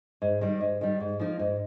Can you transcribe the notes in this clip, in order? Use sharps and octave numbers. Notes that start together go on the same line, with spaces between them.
G#2
D#3 G3
G#2
D#3 G3
G#2
F3 A#3 D#4
G#2